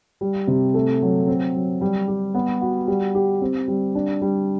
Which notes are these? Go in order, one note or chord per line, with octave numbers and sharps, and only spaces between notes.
G3
C3
A3
F#3
C4
F#3
G3
G4
B3
F#4
G3
G4
C4
G3
D4
G3